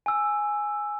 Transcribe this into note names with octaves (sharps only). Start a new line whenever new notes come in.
G#5 E6